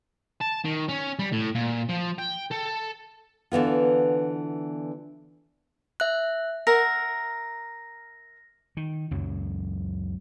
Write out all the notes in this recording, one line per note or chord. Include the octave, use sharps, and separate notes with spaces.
A5
D#3
C#4
G3
A2
A#2
F3
G5
A4
D3 E3 B3 F4
E5 F#6
A#4 E5 F#5 A#6
D#3
C#2 F#2 F#3